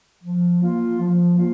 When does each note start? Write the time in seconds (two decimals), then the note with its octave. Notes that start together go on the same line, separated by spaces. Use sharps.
0.24 F3
0.61 A#3 F4
0.99 F3
1.37 A#3 F4